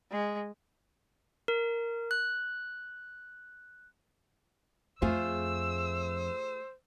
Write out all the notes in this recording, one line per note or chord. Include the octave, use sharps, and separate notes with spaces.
G#3
A#4
F#6
F2 A3 F4 G#4 C5 E6